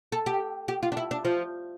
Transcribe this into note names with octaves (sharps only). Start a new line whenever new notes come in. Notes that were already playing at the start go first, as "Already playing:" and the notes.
A4
G4
G4
F4
D4
E4
D4
F3